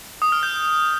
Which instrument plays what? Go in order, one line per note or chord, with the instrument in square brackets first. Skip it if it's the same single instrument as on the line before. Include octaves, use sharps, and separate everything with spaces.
[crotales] D#6
F6
G6